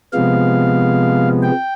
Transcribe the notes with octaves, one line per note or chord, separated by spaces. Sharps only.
C3 F3 G#3 B3 F5
G5